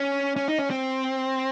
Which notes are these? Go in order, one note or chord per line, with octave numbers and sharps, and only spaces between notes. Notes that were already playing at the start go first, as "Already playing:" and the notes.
Already playing: C#4
C#4
D#4
C#4
C4